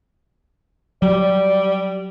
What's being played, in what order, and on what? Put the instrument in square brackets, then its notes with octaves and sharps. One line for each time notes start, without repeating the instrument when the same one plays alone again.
[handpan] F#3 [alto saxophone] G3 [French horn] D5